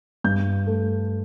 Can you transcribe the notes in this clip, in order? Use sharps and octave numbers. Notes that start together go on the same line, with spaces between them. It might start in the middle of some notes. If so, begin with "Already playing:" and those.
G2 G6
A3